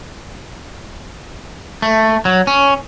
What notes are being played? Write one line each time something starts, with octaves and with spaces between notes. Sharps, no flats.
A3
F#3
C#4